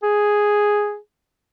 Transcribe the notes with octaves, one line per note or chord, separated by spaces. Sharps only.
G#4